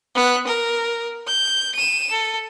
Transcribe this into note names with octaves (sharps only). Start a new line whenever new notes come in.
B3 F#6
A#4
G6
D#7 E7
A4